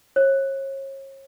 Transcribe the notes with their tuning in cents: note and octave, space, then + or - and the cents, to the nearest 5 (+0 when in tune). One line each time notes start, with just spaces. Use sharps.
C#5 -35